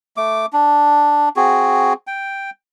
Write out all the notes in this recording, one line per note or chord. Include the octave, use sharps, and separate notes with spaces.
A3 D6
D4
C4 F#4 G#4
G5